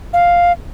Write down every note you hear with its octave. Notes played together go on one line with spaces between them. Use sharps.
F5